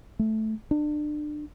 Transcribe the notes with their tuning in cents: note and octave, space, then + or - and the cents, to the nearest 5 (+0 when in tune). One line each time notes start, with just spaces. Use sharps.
A3 -10
D4 +30